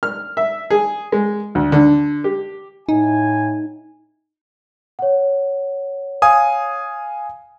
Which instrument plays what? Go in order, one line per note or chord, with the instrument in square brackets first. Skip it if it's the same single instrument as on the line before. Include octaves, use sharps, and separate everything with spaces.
[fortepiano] F6
E5
G#4
G#3
D2
D3
G4
[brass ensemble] A2 G#5 [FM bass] D#4
[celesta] C#5 F#5
[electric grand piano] F5 G#5 D#6